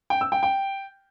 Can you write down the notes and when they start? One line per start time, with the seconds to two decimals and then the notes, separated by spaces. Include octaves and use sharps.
0.10 G5
0.21 E6
0.32 G5
0.43 G5